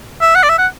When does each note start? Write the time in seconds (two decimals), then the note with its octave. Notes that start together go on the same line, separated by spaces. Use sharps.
0.21 E5
0.35 F#5
0.43 D5
0.49 E5
0.58 F#5